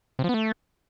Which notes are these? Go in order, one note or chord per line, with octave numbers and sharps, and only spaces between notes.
C3
F3
B3
A3